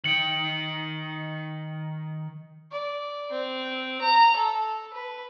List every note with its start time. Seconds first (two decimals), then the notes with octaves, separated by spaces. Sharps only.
0.04 D#3 G5 C#7 F#7
2.71 D5
3.31 C4
4.01 A#5
4.36 A4
4.93 B4